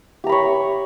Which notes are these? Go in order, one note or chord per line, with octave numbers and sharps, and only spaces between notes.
G4 C#5 A#5 B5